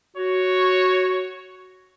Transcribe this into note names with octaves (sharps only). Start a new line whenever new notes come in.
F#4 C#5